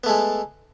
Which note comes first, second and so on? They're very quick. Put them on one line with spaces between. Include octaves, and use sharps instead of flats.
B3 A3 G#3